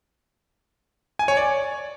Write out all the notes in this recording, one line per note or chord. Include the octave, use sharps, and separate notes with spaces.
G#5
C#5
D5